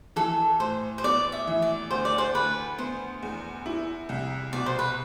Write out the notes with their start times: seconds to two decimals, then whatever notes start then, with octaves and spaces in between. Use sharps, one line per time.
0.16 E3 A4
0.60 A2 C5
0.98 C5
1.04 B3 D5
1.32 E5
1.47 E3
1.62 D5
1.90 D2 C5
2.05 D5
2.18 C5
2.34 D2 B4
2.78 B3 C5
3.23 E2
3.66 E4
4.09 C2
4.53 B2 D5
4.66 C5
4.79 B4